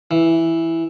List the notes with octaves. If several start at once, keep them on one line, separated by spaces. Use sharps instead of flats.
E3